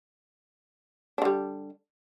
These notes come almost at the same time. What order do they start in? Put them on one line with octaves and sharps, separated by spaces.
D4 D3 G3